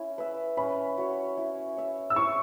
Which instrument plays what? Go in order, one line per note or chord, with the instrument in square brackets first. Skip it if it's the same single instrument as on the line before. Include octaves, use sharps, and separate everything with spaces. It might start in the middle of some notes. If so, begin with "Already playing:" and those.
Already playing: [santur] C#4 E4
B4 E5
[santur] C#4 [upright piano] B5
[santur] F#4 C#5
E4
C#5 E5
[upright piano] E6
[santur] E4 [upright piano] C#6